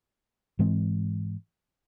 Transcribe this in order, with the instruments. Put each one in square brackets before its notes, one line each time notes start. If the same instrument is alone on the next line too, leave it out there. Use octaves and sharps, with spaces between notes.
[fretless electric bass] G#2 E3 G#3 C4